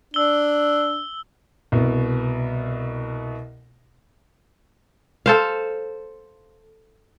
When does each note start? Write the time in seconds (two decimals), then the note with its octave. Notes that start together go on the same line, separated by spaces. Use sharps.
0.14 D4 E6 G7
1.72 C2 B2
5.26 A4 C5 F5